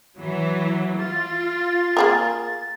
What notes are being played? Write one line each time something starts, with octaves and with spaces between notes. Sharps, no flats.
E3 F#3
F4 A6
A#3 G#4 A#4